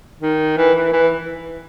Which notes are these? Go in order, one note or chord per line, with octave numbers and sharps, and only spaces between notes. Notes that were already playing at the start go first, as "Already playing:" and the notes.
D#3
E3
E3
E3